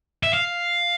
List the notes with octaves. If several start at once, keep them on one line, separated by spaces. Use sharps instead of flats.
E5
F5